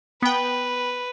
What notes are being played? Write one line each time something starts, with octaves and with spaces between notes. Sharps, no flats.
B3 B4 G5